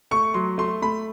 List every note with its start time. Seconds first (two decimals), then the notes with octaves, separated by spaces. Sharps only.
0.11 A3 C#6
0.34 F#3 C6
0.58 A3 C6
0.82 A3 B5